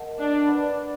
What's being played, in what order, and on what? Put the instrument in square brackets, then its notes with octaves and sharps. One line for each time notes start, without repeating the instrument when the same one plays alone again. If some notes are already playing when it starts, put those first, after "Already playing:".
Already playing: [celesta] A#4 D#5 F#5 A5
[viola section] D4
[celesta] B4 D5 F#5 B5